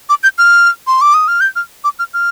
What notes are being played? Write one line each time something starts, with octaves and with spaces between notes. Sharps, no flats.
D6
G6
F6
C6
D6
D#6
F6
G6
F6
D6
F6
F6